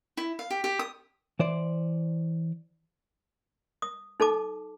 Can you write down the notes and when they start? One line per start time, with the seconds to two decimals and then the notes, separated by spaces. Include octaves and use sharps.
0.17 E4
0.39 F5
0.50 G4
0.64 G4
0.79 D#6
1.39 E3 C5 D5
3.82 D#6
4.20 D#4 A4 A5 D6